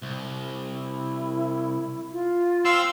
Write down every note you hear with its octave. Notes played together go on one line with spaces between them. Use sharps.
C2
E4
F4
C4 F5 C6 E6